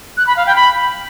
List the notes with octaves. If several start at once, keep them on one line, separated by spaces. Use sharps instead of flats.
F#6
B5
F5
G5
B5